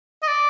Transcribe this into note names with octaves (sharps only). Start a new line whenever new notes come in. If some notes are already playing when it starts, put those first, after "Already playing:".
D#5
D5